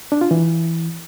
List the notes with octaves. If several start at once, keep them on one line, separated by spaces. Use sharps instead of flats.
D4
F4
E3